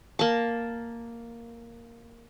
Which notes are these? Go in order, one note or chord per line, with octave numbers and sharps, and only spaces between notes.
A#3 A5